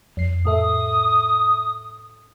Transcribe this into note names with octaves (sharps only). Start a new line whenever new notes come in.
F2 C7
A2 A4 E5 D#6